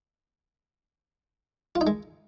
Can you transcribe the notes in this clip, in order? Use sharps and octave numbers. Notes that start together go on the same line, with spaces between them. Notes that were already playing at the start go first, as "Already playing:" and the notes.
F4
D#4
G#3